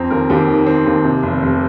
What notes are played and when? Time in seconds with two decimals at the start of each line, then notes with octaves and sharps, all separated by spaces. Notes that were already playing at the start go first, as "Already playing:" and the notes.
Already playing: F2 C4 A#5
0.10 D#2 A#4
0.30 D#2 G4
0.48 D#3
0.67 C4
0.86 D#2
1.04 C3
1.23 F1
1.42 F1